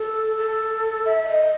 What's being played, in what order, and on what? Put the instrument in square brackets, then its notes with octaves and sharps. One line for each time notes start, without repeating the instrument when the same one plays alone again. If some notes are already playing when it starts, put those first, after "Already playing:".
Already playing: [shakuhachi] A4
A4
E5
E5
D#5